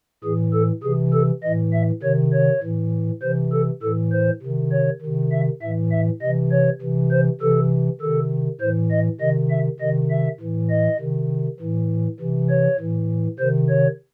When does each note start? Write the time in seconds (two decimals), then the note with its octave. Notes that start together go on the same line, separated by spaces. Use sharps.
0.24 A2 E3 G#4
0.53 A4
0.83 C3 E3 G#4
1.13 A4
1.43 E3 D#5
1.47 A2
1.73 E5
2.03 C3 D#3 C#5
2.33 C#5
2.63 A2 E3
3.22 C3 E3 C5
3.53 A4
3.82 A2 E3 A4
4.13 C5
4.42 C3 D#3
4.72 C#5
5.02 C3 D#3
5.32 E5
5.62 A2 E3 E5
5.92 E5
6.22 C3 E3 D#5
6.52 C#5
6.82 C3 E3
7.11 C5
7.41 C3 E3 A4
8.01 C3 D#3 A4
8.61 A2 E3 C5
8.91 D#5
9.21 C3 D#3 D#5
9.50 E5
9.80 C3 D#3 D#5
10.11 E5
10.40 A2 E3
10.70 D#5
11.00 C3 D#3
11.60 A2 E3
12.20 C3 E3
12.50 C#5
12.79 A2 E3
13.39 C3 D#3 C5
13.69 C#5